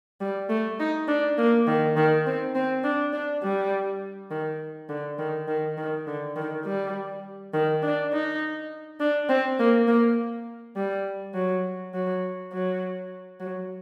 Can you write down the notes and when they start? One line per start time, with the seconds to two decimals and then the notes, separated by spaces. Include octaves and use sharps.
0.21 G3
0.49 A3
0.79 D#4
1.08 D4
1.38 A#3
1.67 D#3
1.96 D#3
2.26 C4
2.55 C4
2.84 D4
3.13 D4
3.43 G3
4.30 D#3
4.89 D3
5.19 D#3
5.48 D#3
5.78 D#3
6.07 D3
6.36 D#3
6.65 G3
7.53 D#3
7.83 D4
8.12 D#4
9.00 D4
9.29 C4
9.59 A#3
9.88 A#3
10.76 G3
11.34 F#3
11.94 F#3
12.52 F#3
13.40 F#3